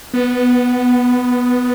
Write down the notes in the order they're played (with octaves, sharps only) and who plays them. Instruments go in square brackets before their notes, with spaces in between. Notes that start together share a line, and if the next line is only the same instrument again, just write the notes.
[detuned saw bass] B3